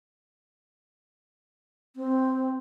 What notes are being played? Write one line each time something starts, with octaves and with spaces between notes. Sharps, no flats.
C4